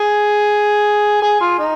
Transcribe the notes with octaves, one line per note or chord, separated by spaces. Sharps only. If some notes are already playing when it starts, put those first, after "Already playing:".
Already playing: G#4
G#4
F4
D#4